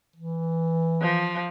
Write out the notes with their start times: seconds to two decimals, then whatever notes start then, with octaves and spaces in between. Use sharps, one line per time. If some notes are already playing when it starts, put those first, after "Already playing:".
0.16 E3
1.02 F3